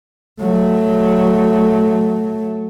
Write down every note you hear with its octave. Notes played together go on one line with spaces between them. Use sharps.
F#3 A3